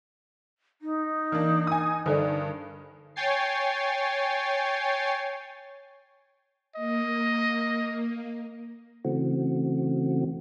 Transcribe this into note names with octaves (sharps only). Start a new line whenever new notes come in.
D#4
E3 A#3 D4
G#5 D#6
G2 D3 D#3 A4 D5
C#5 G5 G#5 A6 C7
A#3 D#5
C#3 E3 A3 C4 F#4